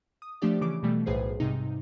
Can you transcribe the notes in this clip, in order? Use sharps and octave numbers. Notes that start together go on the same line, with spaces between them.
D#6
F3 A3 D4 G4 D5
C#3 E3 D6 D7
B2 E3 G3 A3
B1 A2 G#4 B4 C5 C7
G#2 C3 G3 D#4